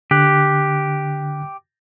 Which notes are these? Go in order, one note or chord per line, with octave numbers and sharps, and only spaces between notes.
D3 G4 F#6